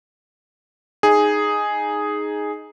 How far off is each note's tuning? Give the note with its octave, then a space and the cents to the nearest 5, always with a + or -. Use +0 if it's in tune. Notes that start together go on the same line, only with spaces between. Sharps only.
D#4 +0 G#4 +0